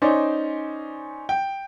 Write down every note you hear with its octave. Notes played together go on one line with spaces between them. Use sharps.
C#4 D#4 C5 D5
G5